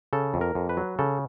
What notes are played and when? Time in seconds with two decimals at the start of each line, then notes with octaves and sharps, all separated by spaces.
0.13 C#3 A4
0.34 F2
0.41 A#4
0.55 F2
0.69 B4
0.77 F#3
0.99 C#3 A4